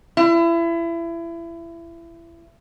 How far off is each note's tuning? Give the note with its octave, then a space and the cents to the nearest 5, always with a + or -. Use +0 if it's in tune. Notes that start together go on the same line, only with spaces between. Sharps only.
E4 +30